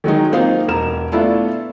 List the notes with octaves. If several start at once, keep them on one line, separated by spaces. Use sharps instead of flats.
D#3 F#3 G#3 D#4
A#3 C4 D#4 F4 F5
E1 A#4 E7
A3 B3 D4 E4 F4 A4